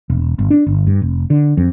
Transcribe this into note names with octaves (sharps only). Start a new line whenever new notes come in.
E1
G1
D4
G1
G2
F1
D3
F2